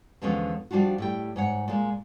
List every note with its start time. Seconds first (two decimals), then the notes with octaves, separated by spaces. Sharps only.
0.22 E2 D3 F3 G#3 B3 C#4
0.71 F3 G3 D4 F4 F#4
0.98 A2 G3 G5
1.36 G#2 C#5 F#5
1.68 A#2 G#3